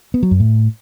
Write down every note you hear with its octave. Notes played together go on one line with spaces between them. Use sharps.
B3
F#3
F#2
A2